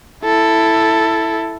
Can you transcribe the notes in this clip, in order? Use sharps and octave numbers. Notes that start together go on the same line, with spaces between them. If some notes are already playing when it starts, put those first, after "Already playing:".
E4 A4